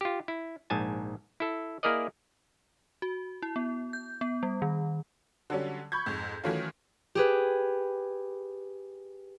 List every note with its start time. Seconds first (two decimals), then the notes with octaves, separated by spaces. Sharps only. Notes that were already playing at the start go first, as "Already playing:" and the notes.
0.01 F4 G4
0.28 E4
0.70 A#1 G#2 G#5 A5
1.40 E4 A4
1.83 A#3 E4 G#4 A#4 D5 D#5
3.02 F#4
3.42 E4
3.56 B3
3.93 G6
4.21 B3
4.43 G3
4.62 D#3
5.50 D3 F#3 G3 C#4
5.92 B5 C#6 G6 G#6
6.06 F2 G#2
6.44 D#3 E3 F#3 A3 C#4 F4
7.15 G4 G#4 B4